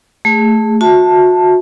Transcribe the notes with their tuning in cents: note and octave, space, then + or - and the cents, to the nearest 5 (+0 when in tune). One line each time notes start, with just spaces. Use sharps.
A3 +5 G#4 -20
F#4 -30 E5 -10 A5 +0